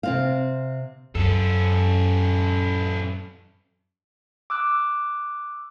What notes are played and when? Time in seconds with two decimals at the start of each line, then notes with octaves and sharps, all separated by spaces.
0.03 C3 C4 F5
1.15 F#2 C#4 A4
4.50 D6 E6 F#6